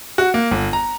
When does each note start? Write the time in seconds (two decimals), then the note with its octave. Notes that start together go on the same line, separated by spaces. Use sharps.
0.18 F#4
0.34 A#3
0.51 G1
0.73 A#5